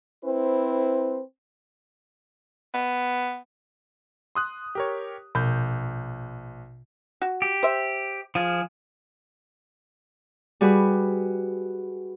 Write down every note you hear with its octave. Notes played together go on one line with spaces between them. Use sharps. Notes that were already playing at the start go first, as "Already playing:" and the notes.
C4 E4 B4 C5
B3
C6 D#6 F#6
G4 A#4 C#5
A#1 B2 G6
F#4
G4
C5 E5
F3 F4 G#4
G3 F#4 G#4 B4